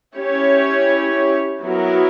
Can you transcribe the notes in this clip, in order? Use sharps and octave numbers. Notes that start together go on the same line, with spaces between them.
C#4 E4 G4 C#5
F#3 B3 E4 A#4